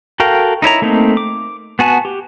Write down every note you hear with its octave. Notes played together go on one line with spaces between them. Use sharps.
F#4 A4 A#4 F5 G5
D#4 E4 C#5 A#5
A3 A#3 C4 D#4
D6
B3 F#4 G#5 A5
G4